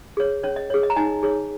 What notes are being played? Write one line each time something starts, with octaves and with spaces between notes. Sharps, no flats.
G#4 C#5
C#4 C#5
D#5
G#4 C#5
D#5
A#5
D#4 D#5 G#5
G#4 C#5